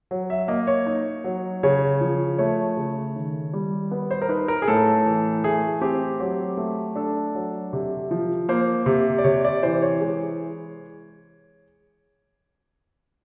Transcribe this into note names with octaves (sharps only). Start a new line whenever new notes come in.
F#3
E5
A#3 D#5
C#5
D#4
F#3
C#3 C#5
F3
A3 C#5
C#3
D#3
G3
B3
C5
A#4
D#4 B4
A#4
G#4
A2 A4
E3
A3 G#4
C4 G4
F#3 G4
A3
D4 A4
F#3
C3
F3
A#3 C5
C3
D5
C3 C#5
D5
E3 C5
C#5
G#3